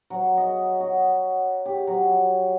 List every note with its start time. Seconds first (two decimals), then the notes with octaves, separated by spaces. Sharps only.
0.10 F#3
0.37 D#5
0.80 F#4
1.66 G4
1.87 F#3